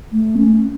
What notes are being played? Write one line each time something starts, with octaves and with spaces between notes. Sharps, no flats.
A3
C#4